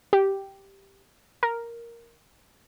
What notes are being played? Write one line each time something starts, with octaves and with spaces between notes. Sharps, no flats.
G4
A#4